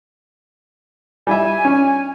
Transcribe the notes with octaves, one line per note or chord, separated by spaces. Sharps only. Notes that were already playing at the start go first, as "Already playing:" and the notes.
G3 E4 E5 G#5
C#4